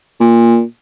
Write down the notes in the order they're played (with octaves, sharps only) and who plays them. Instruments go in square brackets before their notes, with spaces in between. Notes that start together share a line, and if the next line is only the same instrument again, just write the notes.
[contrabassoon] A#2